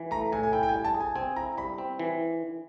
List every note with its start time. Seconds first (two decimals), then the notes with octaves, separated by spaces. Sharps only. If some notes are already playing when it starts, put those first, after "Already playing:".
Already playing: E3
0.11 A3 A#5
0.32 A2 G#5
0.43 G#5
0.53 E4 G5
0.63 G5
0.69 G#5
0.74 G3
0.85 A5
0.94 G#4
1.00 G#5
1.16 C4 G#5
1.36 E4 A#5
1.57 G3 B5
1.78 C4
1.99 E3